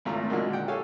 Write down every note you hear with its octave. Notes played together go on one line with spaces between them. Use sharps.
G#1 C#2 A3 F4 A#5
A#2 D3 D#3 F#3 G#3 A#3
F#5 G5
G4 A4 C#5 F5 G#5